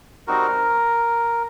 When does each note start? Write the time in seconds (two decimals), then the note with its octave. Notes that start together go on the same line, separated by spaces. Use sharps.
0.27 G3 C4 D#4 F#4 A#4